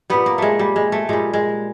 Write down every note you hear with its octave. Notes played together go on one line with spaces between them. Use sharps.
A#2 G3 B3
A#3
G#3 A3
G3
G#3
A3
A#2 G3 G#3
G#3